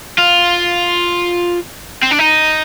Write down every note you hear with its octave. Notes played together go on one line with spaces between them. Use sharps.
F4
C4
D4
D#4